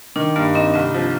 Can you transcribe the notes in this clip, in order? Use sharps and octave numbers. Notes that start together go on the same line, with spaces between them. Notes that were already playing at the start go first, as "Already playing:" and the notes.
D#3 D4
G2 A#3
C4 D#4
C2 C4
F3